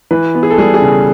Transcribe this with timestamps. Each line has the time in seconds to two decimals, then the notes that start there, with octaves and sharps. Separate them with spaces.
0.11 E3 B4
0.35 B3
0.43 G#4
0.50 A4
0.58 G3 G#4
0.74 G#4
0.82 C#3